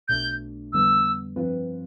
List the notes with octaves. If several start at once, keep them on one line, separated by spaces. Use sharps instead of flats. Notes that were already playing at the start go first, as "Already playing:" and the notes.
B1 B2 A3 D4 G6
F2 D3 G3 B3 E6
G2 F3 C4 F4 B4